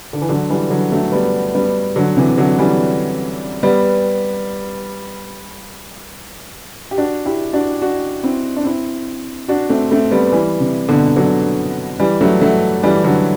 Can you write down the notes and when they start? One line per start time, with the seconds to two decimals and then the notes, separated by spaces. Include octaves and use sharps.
0.13 D3
0.22 E3
0.29 D3 F#3
0.50 E3 G3
0.70 D3 F#3
0.92 F#3 A3
1.12 G3 B3
1.55 G3 B3
1.96 D3 F#3
2.17 C3 E3
2.38 D3 F#3
2.59 E3 G3
3.63 G3 B3
6.91 G4
6.98 D4 F#4
7.26 E4 G4
7.53 D4 F#4
7.81 D4 F#4
8.23 C4 E4
8.56 D4
8.65 C4 E4
9.48 D4 F#4
9.70 A3 C4
9.91 A3 C4
10.11 G3 B3
10.32 E3 G3
10.60 C3
10.89 B2 D3
11.16 D3 F#3
12.00 E3 G3
12.21 F#3 A3
12.41 F#3 A3
12.83 E3 G3
13.04 D3 F#3